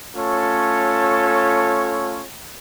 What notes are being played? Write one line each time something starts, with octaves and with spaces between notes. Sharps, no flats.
A3 C#4 F4 A4 C#5